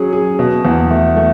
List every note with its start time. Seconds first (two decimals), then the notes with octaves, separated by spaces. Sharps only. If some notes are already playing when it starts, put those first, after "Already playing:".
Already playing: F#3 C#4 G#4
0.13 G#4
0.39 B2
0.65 E2
0.91 A3
1.16 A3